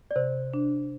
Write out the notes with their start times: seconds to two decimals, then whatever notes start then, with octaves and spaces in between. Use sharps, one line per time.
0.11 D5
0.16 C3 C5
0.54 D4